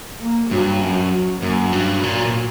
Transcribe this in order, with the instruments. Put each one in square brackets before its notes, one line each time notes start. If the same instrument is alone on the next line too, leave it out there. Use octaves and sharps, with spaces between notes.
[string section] A#3
[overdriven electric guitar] G2 [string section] F#3
[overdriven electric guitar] F#2 [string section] F#3
[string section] F#3
[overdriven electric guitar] F#2 [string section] A#3
[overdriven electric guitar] G2 [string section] F#3
[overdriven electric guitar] A#2
A#2